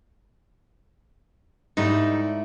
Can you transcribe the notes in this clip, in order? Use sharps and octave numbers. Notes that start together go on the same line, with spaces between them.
G#2 G3 A3 D#4 E4